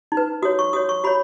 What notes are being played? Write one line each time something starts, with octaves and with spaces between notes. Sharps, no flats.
D#4
B4
F#4 C#5 D#6
C#6
F#4 C#5 D#6
C#6
F#4 C#5 B5